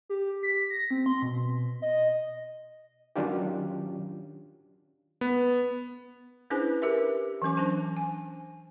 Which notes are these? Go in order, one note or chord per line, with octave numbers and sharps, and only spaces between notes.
G4
B6
A#6
C4
C6
B2
D#5
D#3 F#3 C#4 D4 F4 G4
B3
C#4 D4 E4 G#4 B4 C5
G4 A#4 B4 E5
E3 F#3 C#4 D6
D4 C5 A5
G#5